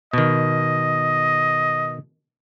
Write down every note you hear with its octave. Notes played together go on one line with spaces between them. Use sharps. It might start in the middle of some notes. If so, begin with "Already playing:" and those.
B2 D#3 D#5